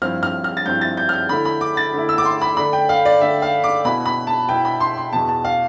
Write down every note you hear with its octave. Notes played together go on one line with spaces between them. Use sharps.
G2 F3 C4 E4 F6
F6
F6
A6
G2 F3 C4 E4 G6
A6
G6
F6
G6
D3 A3 E4 B5
B5
D6
A6
D3 A3 E4
E6
D6
C6
B5
D3 A3 D4 B5
G5
F5
D5
D3 A3 D4 E5
F5
D6
B2 B3 E4 B5
B5
A5
B2 B3 E4 G5
B5
C6
C6
E2 B2 B3 A5
A5
F5